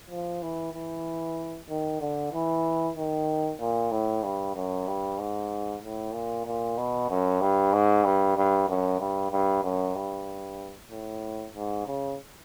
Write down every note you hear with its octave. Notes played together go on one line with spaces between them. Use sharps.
F3
E3
E3
D#3
D3
E3
D#3
A#2
A2
G2
F#2
G2
G#2
A2
A#2
A#2
B2
F#2
G2
G#2
G2
G2
F#2
G2
G2
F#2
G2
A2
G#2
C#3